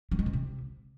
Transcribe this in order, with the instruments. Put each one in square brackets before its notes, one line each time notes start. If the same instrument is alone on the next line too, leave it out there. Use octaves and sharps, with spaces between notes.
[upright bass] F#3
G#3
B2
C3